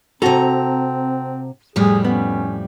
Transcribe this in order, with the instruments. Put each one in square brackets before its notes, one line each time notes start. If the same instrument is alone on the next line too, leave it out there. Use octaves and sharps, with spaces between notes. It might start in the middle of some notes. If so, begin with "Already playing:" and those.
[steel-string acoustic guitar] C3 A#5 [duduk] C4 [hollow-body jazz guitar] F#4 A4
[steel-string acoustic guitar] F2 A2 G3 [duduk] G#4
[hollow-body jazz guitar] B3 [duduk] C#4